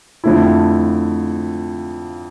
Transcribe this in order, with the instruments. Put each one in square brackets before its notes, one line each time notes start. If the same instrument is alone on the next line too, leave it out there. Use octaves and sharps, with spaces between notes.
[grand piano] F2 D3 F3 A3 E4